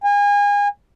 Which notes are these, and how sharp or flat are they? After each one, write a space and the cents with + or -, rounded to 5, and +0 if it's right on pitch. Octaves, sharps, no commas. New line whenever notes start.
G#5 -30